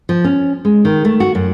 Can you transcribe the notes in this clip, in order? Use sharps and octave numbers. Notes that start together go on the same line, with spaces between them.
F3
C#4
G#3
D#3
A3
F#4
F#2